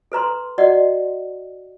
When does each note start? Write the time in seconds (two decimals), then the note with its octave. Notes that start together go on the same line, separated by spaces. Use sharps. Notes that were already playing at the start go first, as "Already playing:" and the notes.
0.12 A4 B4 A#5 C6
0.58 F#4 D5 D#5 F#5